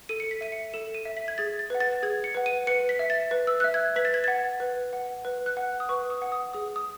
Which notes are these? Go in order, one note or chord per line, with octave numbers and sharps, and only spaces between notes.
A4 D#7
C#7
B6
E5 D#7
C#7
A4 E7
D#7
E5
B6
G#6
G#4 A6
A6
B4 F#5
A6
G#4 G#6
C#7
B4 F#5
D#7
B4 C#7
B6
E5
A6
B4
E6
E5 F#6
G#6
B4 B6
A6
G#6
F#5 A6
B4
F#5
B4
F#6
F#5
D#6
B4 C#6
D#6
F#5
D#6
G#4 D#6
D#6